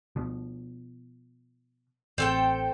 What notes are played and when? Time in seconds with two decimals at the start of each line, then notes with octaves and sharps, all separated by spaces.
0.16 B2 F3
2.18 A1 C4 A4 G5